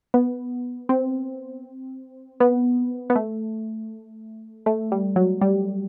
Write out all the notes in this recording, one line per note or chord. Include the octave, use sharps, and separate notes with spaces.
B3
C4
B3
B3
A3
A3
G3
F#3
G3